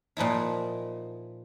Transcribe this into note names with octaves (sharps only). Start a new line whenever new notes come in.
A#2 F3 D#4 E4